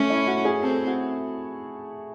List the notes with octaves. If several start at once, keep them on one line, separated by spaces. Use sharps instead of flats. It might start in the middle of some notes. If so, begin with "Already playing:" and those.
Already playing: A3 C#4
E4
F#4
G#4
C4 A4
F#4